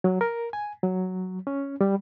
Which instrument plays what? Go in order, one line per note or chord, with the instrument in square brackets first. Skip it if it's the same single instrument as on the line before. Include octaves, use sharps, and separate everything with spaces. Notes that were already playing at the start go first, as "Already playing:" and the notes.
[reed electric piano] F#3
A#4
G#5
F#3
C#4
G3